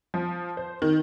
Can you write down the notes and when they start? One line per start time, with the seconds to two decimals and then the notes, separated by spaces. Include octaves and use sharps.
0.14 F3
0.57 C5
0.82 D#3